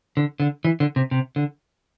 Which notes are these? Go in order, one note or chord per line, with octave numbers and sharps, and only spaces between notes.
D3
D3
E3
D3
C3
C3
D3